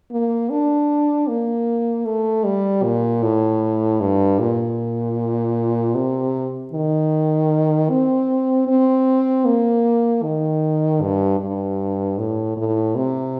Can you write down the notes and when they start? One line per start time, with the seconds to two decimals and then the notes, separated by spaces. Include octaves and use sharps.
0.11 A#3
0.50 D4
1.28 A#3
2.06 A3
2.45 G3
2.84 A#2
3.22 A2
4.00 G2
4.39 A#2
5.95 C3
6.73 D#3
7.90 C4
8.68 C4
9.46 A#3
10.23 D#3
11.02 G2
11.40 G2
12.18 A2
12.57 A2
12.96 C3